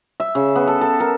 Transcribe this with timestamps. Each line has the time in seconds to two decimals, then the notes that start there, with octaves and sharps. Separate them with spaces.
0.20 E5
0.35 C#3
0.55 B3
0.67 A4
0.81 A4
1.00 A#4